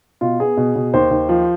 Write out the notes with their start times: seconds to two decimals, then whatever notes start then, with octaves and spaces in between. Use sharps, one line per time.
0.21 B2 F4
0.40 B3 G#4
0.57 B2
0.75 B2
0.94 D#2 C5
1.11 D#2
1.29 F3